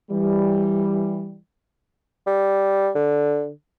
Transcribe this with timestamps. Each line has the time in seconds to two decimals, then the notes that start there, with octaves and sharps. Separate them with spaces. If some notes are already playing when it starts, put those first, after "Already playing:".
0.11 E3 G3
2.27 G3
2.95 D3